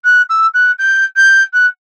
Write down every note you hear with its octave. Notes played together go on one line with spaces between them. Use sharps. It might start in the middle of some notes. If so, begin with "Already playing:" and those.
F#6
E6
F#6
G6
G6
F#6